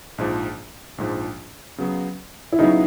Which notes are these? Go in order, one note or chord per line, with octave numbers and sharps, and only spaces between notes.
A#1 G#2 F3
A#1 G#2 F3
C#3 F#3 B3
E4
C#3 F#3 B3 D#4